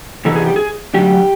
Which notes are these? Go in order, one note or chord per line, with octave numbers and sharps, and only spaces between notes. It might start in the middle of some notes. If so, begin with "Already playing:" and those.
C3 E3 G3 B3 D#4 A4
G#4
G4
G#4
F#2 D3 F#3 A3 D4 G4